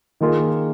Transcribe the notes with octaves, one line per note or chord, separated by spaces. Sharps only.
D#3 A#3 F4 G#4